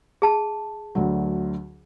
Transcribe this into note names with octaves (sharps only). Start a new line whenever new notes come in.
G#4 A5
D2 D3 F#3